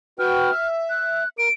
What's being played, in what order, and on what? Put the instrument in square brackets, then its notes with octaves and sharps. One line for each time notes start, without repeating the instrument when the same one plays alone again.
[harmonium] F#4 B4 G5 [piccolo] F6
[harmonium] E5
[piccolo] F#6
[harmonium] A#4 [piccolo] D7